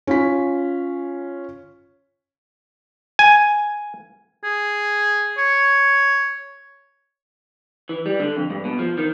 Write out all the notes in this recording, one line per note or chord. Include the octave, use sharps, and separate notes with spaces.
C#4 F4 B6
G#5
G#4
C#5
E3
G3
D3
F2
G2
B2
F3
D#3